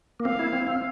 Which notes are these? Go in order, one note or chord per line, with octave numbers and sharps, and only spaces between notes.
A#3
C4 F5
E4
C4
C4